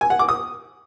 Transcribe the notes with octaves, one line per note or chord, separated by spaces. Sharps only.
G#5
F#5
D6
D#6